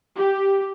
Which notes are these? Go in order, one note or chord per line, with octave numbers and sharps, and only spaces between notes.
G4